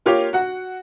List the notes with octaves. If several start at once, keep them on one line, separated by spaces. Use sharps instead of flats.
A#3 F4 G4 C#5
F#4 F#5